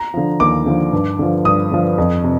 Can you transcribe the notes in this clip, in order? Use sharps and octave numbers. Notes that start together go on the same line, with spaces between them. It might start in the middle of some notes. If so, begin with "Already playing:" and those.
Already playing: A#5
D3 F3
D#2 D6
D3 F3
G2
D3 F3
G2 D#6
D3 F3
F2
C3